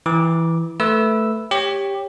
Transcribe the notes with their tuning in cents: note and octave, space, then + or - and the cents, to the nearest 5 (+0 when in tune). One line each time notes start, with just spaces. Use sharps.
E3 +0 D6 +0
A3 +0 B4 +0 E6 +0
G4 +10 C#5 +0